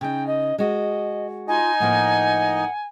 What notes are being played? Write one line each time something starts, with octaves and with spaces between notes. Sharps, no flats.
C#3 D#4 G5
D#5
G#3 F#4 D#5
D#4 F4 D#5 G#5
A2 F3 A#3 F#5